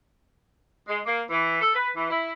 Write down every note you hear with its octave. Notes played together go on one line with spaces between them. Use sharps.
G#3
A#3
E3
A4
B4
E3
E4